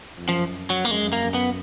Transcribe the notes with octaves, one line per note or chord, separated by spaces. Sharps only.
F2
F#2 F3
F#3
A#3
F#2 G#3
F#2
A#3
F#2
B3